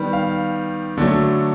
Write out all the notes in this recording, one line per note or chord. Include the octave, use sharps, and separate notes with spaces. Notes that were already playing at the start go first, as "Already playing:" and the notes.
Already playing: D#3 G3 B3
F5
D3 F#3 A3